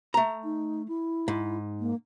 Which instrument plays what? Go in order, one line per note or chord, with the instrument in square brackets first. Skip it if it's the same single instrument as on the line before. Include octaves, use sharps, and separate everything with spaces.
[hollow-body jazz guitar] A3 A#5
[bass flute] D#4
E4
[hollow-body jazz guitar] G#2
[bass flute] A#3